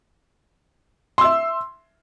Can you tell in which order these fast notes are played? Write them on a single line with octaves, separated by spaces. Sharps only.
C6 E6 E5